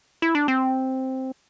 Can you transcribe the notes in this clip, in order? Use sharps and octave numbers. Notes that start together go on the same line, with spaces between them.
E4
D4
C4